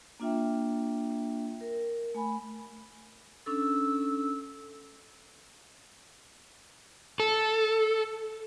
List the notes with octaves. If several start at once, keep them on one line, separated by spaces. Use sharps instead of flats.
A#3 D4 F4 E5 G5
A#4
A3 G#5 B5
C#4 D4 A4 E6
A4